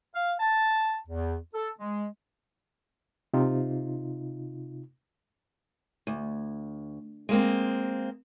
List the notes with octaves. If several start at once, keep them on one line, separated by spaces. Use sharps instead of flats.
F5
A5
E2
A4
G#3
C3 D#4 F4
D2
G#3 A#3 C4